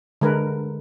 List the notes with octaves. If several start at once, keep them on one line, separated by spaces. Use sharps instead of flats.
D3 G#3 A#4 B4